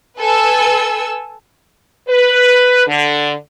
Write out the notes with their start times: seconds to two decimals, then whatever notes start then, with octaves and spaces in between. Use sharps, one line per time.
0.19 A4 B4 G#5 E6
2.08 B4
2.87 D3